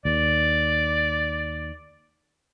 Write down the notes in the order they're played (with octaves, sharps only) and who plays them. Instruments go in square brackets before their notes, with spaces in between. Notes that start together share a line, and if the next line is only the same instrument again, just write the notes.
[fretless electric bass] D#2 [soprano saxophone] D5